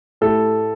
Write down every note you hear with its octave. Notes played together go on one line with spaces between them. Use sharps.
A2 A3 E4 G4 A4